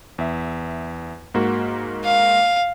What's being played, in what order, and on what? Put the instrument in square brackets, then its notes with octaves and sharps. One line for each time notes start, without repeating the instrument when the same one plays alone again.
[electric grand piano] E2 E5
G#2 A#3 F#4
[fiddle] F5